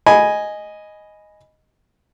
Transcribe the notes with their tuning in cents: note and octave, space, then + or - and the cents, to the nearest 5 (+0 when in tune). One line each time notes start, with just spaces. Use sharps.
D#5 +0 G#5 +0 B5 -5